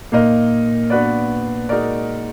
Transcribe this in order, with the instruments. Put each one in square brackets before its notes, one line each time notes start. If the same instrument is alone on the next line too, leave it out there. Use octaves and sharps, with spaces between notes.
[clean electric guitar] A#2 [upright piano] A#3 D#4 A#4 D#5
[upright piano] B3 D4 F#4 B4 D5
G#3 D#4 F#4 A#4 D5